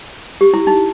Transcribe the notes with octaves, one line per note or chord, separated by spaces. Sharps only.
G4
E4
D#4